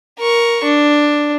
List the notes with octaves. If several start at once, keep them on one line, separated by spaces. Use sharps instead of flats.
A#4 C#6
D4